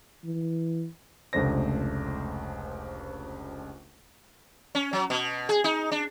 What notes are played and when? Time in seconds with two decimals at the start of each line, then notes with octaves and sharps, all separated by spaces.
0.24 E3
1.33 F1 C#2 A3 D4 C5 A#6
4.75 C#4
4.93 F#3
5.10 B2
5.49 G#4
5.64 D#4
5.92 D4